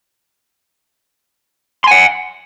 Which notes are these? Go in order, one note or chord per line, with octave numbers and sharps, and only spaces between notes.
F#5 G#5 C6